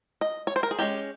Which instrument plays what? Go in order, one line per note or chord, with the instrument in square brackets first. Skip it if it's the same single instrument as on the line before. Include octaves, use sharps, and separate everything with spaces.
[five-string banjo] D#5
C#5
C5
A#4
G#4
G#3 C#4 G4